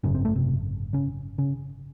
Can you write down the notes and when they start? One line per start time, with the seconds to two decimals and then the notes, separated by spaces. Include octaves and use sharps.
0.03 G#1 F#2 C#3 C#4
0.14 C4
0.25 A3
0.35 C3 C4
0.93 C#3 C#4
1.38 C#3 C#4